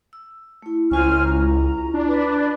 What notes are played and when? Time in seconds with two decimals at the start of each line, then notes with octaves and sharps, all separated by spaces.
0.13 E6
0.62 A3 E4
0.91 C#2 E4 F4 C5 G#5 C#6 F6
1.24 A#5
1.94 D4
2.07 B4 D5